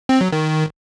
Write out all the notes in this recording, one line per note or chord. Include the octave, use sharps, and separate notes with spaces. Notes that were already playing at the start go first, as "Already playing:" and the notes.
C4
F#3
D#3